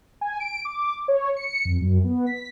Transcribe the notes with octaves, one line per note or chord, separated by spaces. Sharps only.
G#5
D7
D6
C#5
C#7
F2
F#2
B3
B6